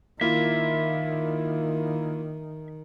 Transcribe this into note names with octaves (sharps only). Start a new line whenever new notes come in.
D#3 A#3 E4 F4 E5